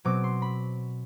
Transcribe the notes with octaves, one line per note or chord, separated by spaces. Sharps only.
B2 F#3 C4 D6
C6
B5